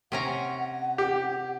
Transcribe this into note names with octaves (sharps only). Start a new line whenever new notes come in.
C3 C#4 F#5 A#5
G4